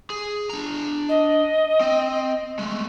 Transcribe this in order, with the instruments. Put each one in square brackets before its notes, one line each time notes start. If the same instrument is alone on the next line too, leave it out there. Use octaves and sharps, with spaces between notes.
[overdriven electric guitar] G#4
D4 A#5
[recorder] D#5
[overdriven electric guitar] C4
G#3 A3